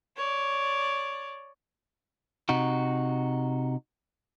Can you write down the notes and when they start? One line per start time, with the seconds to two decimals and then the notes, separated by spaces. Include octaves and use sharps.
0.16 C#5 D5
2.49 C3 D#4 F#4